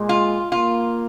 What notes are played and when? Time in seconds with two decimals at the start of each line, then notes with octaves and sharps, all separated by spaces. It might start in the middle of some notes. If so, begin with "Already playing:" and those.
Already playing: A#2 G#3
0.09 F4
0.52 A#3 F4